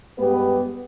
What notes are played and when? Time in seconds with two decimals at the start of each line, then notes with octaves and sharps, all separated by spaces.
0.18 G2 G#3 B3 G4 B4